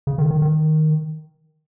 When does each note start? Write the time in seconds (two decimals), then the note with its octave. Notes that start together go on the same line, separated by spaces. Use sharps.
0.07 C#3
0.18 D#3
0.31 D#3
0.42 D#3